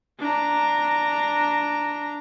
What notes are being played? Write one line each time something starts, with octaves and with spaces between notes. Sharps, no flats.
D4 A#5